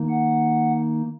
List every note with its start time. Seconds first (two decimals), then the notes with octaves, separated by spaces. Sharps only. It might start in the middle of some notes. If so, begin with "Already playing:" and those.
Already playing: D#3 A#3 D#4
0.10 F#5